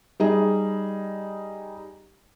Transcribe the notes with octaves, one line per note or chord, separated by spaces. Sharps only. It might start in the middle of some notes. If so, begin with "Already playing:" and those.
G3 D#4 G#4